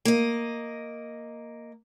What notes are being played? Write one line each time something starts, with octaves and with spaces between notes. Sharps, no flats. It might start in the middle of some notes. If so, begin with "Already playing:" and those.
A#3 D#5